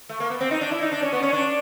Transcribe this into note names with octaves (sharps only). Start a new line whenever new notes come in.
A3
A#3
B3
C4
D#4
D4
E4
D#4
D4
C#4
B3
C#4
D4